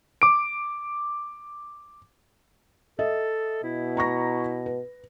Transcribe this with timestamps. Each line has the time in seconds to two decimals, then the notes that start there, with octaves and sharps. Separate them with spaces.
0.22 D6 D7
2.99 A4 D#5 E5
3.63 B2 E4
3.97 A#5 C#6 A#6
4.66 B4